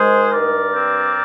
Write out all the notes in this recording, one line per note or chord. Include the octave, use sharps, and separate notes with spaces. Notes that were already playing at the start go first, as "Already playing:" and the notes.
Already playing: D#3 G#3 G#4 C5
G2 A#4 D5
C4